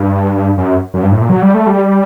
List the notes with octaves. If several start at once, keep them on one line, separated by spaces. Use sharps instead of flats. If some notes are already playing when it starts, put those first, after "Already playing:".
Already playing: G2
F#2
F#2
G2
A2
A#2
F#3
G3
A3
G3